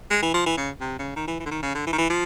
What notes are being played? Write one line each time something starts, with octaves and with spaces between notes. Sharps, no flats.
G#3
E3
F3
E3
C#3
C3
C#3
D#3
E3
E3
D3
D#3
C#3
D3
E3
D#3
E3
F3